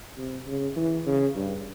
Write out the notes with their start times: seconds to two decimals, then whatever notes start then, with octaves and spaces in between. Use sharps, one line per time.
0.17 C3
0.46 C#3
0.76 E3
1.06 C#3
1.36 G2